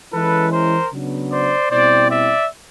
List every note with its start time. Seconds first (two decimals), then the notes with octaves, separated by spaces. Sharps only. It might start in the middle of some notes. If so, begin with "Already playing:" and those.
0.12 E3 G#3 C#4 E4 A4 B4
0.52 A#4 C5
0.91 C#3 F#3 B3 D4
1.31 C5 D5
1.71 B2 G3 C4 E4 C5 D5
2.10 D5 E5